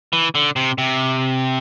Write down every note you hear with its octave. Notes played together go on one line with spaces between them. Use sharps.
E3
D3
C3
C3